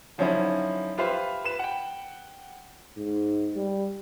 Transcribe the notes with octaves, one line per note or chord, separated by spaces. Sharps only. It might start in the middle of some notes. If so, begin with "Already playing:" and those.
D3 F3 F#3 C#4 D#4 E4
F4 G4 B4 C5 E5 F5
B4 E7
F#5 G5
G#2
G3